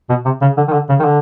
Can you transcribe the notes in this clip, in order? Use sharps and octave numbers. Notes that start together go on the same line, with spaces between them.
B2
C3
C#3
D3
D#3
D3
C#3
D#3
D3